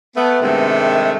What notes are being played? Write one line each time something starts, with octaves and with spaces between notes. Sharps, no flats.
A3 B3
G2 C3 D#3 G#3 A3